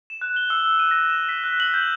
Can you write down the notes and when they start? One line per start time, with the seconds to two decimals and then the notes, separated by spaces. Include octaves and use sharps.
0.10 E7
0.21 F#6
0.36 G7
0.50 E6
0.79 D#7
0.91 A#6
1.10 E7
1.29 B6
1.44 F#6
1.60 F#7
1.74 G6